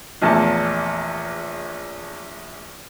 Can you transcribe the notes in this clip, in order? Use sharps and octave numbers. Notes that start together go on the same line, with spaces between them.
A#1 E2 A2 A5